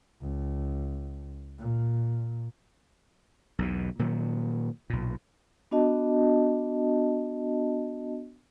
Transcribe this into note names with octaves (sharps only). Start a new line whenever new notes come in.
C#2
A#2
B1 E2 B2
A#2 D#3 F#3
B1 A#2
B3 D4 F#4 D#5 A5